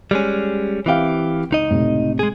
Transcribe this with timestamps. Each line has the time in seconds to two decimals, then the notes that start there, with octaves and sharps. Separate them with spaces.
0.11 G3 G#3 C#4
0.86 E3 C4 G4 E5 F5
1.51 C#2 D#4 D#5
1.70 A2 C3
2.19 G#3 G#4